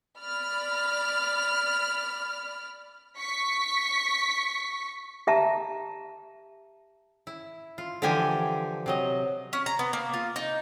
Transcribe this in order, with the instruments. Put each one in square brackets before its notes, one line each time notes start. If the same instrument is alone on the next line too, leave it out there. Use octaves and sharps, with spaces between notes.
[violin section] D5 B5 F6
[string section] C#6 B6
[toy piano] G4 E5 A5 A#5
[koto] E4
F4
D3 E3 F3 G4 G5 G#5
C3 F#3 D#5
[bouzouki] C#4
A#5
B3
A#3
F4
D#4